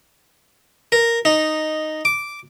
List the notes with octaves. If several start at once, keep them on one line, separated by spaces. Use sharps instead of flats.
A#4
D#4
D6